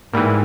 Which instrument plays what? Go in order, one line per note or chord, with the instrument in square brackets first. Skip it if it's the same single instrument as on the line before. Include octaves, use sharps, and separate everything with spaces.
[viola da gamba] G#2 [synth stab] E3 G3 A#3